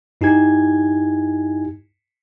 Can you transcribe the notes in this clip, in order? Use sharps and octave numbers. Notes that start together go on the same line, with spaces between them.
G2 D#4 E4 G4 G#5 G#6